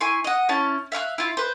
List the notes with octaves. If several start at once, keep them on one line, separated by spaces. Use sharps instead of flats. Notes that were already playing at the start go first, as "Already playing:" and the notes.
E4 G#5 C6 C#6
D#5 F#5
C#4 E4 A5
E5 F5 C#6 F#6
E4 F4
B4 C5